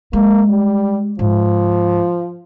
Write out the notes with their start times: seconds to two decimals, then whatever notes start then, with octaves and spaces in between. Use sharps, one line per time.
0.13 G#3 A#3
0.49 G3
1.19 G#2 F3